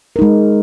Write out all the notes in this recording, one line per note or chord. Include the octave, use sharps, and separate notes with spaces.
G#3 D#4 A#4